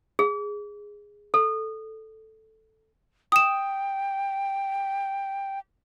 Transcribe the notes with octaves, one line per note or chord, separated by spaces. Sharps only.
G#4
A4
G5 D#6 E7